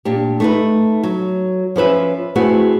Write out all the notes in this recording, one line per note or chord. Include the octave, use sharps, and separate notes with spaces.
A#2 D4 G4
A3 D#4 B4
F#3
F3 C#4 B4 E5
A3 B3 C4 E4 F#4 G#4